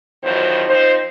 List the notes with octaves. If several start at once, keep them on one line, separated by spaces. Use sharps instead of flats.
E2 B2 D#3 F3 F#3 C5
F3 C4 D#4 C5